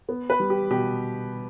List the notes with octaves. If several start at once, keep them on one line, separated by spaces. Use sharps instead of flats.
B3
B4
G3
G4
B2 G4